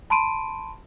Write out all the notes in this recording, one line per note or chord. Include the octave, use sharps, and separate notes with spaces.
A5 B5 C6 D7 D#7